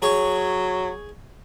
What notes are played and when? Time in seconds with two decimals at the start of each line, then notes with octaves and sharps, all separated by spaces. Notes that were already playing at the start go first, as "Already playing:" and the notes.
0.02 F#3 G#4 C#5 C#6